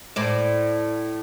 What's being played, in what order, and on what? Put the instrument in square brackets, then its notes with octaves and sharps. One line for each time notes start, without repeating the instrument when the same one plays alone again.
[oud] A2 C5 D5